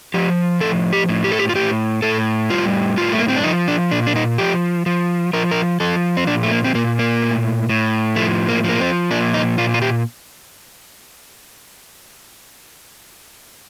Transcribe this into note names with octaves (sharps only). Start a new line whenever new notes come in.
F3 G4
A2 A4
G4
A2
G4
A4
G4
F4
A2 G4
A2 A4
G3 F4
A2 F4
A3
A#3
C4
D4
F3 D#4
D4
A#2 D4
D4
D#4
F3 G4
F3
F3 A#4
A#4
F3 A4
C4
A#2 D4
A3
A#3
C4
A#2 A#3
A#3
A2
A2
F3 A3
A#3
F3 A#3
C4
A#2 D4
D#4
A#2 F4
F4
G4